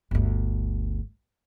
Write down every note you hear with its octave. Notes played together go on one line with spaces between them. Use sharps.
G1 D2